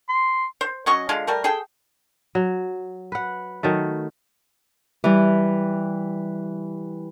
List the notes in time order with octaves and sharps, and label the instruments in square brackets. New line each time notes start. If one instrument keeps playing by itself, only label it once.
[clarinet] C6
[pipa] C5
F#3 C#4 D#5 C#6
D3 G#3 F4
G3 A3 A#4
G#4 A4 G5
[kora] F#3
B4 F#5
D#3 F#3 A3
[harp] E3 G3